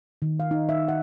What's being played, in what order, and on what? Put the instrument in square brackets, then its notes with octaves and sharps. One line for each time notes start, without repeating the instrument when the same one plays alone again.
[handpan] D#3
F5
D#4
E5
F#5